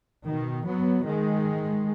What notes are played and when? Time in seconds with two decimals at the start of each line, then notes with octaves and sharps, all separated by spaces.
0.25 B2 D#3
0.64 F#3 B3
1.05 D#3 G#3